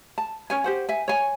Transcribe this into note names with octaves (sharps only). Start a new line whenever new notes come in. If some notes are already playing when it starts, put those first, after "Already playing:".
A5
C#4 C#5 G#5
G4 C5 F#5
E5 G#5
C#5 G#5